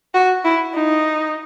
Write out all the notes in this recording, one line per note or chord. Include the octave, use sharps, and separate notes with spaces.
F#4
E4
D#4